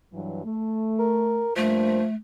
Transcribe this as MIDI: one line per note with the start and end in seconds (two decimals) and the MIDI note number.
0.13 0.44 43
0.13 0.44 52
0.13 0.44 54
0.44 1.42 57
0.99 1.53 70
1.57 1.99 43
1.57 2.04 53
1.57 2.14 57
1.57 1.99 58
1.57 1.99 72